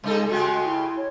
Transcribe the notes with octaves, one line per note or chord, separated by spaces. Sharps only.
C3 G#3 D#4 A4
C#3 G#3 F#4 G4
E4
C#5